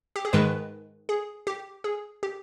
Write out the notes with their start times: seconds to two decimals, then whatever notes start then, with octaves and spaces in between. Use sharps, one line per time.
0.16 G4
0.25 G#4
0.33 G#2 D#3 G#3 B4
1.09 G#4
1.47 G4
1.84 G#4
2.23 G4